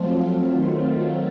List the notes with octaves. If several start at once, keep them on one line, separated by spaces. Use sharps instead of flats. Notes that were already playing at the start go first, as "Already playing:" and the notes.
Already playing: F3 F#3 A3 C4 F4
D#3